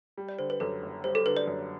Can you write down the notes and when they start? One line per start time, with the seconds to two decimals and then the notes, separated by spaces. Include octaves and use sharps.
0.18 G3
0.29 D5
0.39 D3 C5
0.50 B4
0.60 F#2 A4
0.82 F#1
1.04 G3 C5
1.15 A4
1.26 D3 B4
1.37 D5
1.47 F#2